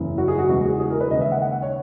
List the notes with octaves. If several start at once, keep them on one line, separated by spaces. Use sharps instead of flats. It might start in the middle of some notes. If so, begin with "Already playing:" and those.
Already playing: F#1 E2 C#3
F#4
G#4
F#4
E2 C#3 E3 G#3 F#4
G#4
G#4
A#4
B4
D#2 C#3 G#3 D#5
E5
F#5
F#5
F#5
C#5